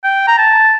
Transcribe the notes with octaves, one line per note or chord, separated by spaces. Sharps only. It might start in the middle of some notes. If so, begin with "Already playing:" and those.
G5
A#5
A5